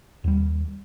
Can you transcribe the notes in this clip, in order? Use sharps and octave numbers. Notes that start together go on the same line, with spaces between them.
D#2 G3